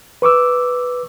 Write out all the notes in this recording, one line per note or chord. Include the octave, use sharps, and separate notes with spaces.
B4 C#6 D6 E6